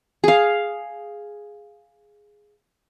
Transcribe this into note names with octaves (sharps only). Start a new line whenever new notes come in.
G#4 F5